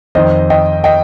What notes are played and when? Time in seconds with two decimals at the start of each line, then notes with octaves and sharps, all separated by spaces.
0.15 F2 D#3 C5 D#5
0.50 D#5 G5
0.84 D#5 G5